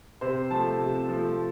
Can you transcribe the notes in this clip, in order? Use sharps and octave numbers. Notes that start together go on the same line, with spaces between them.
C3 C5
F3 A3 A5
C3
F3 A3